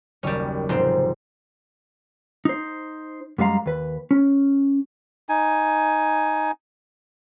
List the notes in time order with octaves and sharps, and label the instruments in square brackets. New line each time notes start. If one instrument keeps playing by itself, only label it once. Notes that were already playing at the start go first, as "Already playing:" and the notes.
[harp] F#1 D#2 [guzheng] G3 C#4
[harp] F1 [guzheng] G#2 C4
[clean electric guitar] D#4 C5
F#2 G3 G#3 F5 A#5
D#2 B4
C#4
[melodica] D#4 G#5